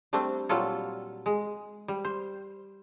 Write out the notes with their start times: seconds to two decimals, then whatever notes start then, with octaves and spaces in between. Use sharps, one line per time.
0.13 G3 A3 C4 D4
0.49 A#2 F#3 G3 F4 A4
1.26 G#3
1.88 G3
2.05 C5